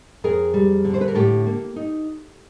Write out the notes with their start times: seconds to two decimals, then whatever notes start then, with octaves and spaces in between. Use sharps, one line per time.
0.24 F2 G#4 A#4
0.54 G3
0.84 D3
0.94 C5
1.01 B4
1.08 A#4
1.15 A2 G4 A4
1.46 A#3
1.76 D#4